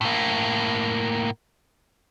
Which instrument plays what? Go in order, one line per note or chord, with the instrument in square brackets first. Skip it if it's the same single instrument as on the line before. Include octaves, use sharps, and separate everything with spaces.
[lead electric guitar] A2 A#3